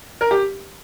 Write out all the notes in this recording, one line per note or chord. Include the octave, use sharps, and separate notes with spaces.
A#4
G4